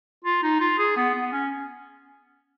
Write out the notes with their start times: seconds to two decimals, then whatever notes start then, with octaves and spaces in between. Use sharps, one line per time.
0.24 F4
0.43 D#4
0.60 F4
0.78 G#4
0.97 B3
1.14 B3
1.32 C#4